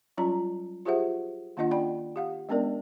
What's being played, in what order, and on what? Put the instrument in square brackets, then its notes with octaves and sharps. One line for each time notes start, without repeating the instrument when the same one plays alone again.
[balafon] F#3 G3 C#4 F4 A#5
F4 G4 G#4 C5 E5 F#5
D#3 A#3 D4 F4 D#5 F#5
C#4 D5 G5 B5
G4 F5 F#5
G#3 B3 C#4 D4 A#4 D5